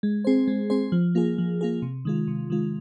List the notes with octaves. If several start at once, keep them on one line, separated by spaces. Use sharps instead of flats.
G#3
C4 G#4 C5
G#3
C4 G#4 C5
F3
A#3 F4 G#4
F3
A#3 F4 G#4
C3
D#3 G#3 F4
C3
D#3 G#3 F4